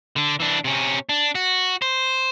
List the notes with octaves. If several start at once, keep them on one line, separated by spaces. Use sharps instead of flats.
D3 D4
E3 D4
C3 C#4
D4
F#4
C5